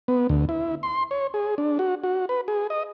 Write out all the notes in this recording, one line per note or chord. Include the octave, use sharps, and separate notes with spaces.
B3
D2
E4
C6
C#5
G#4
D4
F#4
F#4
B4
G#4
D#5